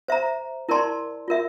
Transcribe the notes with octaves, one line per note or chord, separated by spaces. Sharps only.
C5 E5 A#5
E4 A#4 D5 A5 C6
F4 A#4 E5